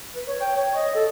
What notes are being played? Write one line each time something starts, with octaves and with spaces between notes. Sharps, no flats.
B4
C#5
G5
C#5
D#5
A4